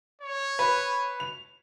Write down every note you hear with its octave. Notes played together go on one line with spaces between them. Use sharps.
C#5
B4
F7